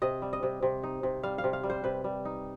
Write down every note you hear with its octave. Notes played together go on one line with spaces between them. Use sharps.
C3 D#5
G3
D#5
C3
C3
D#4
C3
G3 F5
F5
C3
F5
G3
C5
C3 B4
G3
D#4